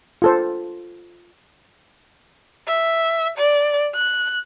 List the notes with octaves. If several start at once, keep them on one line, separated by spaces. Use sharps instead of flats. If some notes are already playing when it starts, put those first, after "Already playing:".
F4 A4 C5
E5
D5
F#6